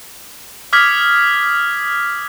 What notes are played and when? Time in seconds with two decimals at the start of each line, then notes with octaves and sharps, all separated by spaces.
0.73 D6 D#6 F6 G#6 B6